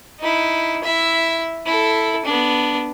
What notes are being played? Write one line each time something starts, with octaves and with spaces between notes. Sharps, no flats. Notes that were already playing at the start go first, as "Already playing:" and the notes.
D#4 E4
E4 E5
E4 A4
B3 D4